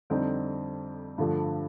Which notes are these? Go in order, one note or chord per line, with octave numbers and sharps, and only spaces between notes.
F2 D3 G3 C4 D#4
G2 D3 F3 A3